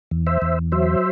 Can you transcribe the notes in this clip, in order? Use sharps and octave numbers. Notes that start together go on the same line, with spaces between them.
E2
C5 E5
E2
F#3 C5 E5